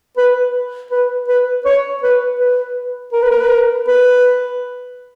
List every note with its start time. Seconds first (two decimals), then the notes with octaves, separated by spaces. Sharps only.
0.17 B4
0.91 B4
1.28 B4
1.65 C#5
2.03 B4
2.40 B4
3.13 A#4
3.22 B4
3.31 A#4
3.40 B4
3.49 A#4
3.88 B4